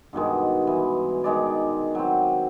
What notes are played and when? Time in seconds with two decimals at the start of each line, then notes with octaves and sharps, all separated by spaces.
0.13 G2 B2 D#3 G#3
0.67 E3
1.24 D#3 G#3 D5
1.95 F#3 C4